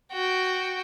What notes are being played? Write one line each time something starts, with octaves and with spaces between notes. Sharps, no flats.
F#4 G5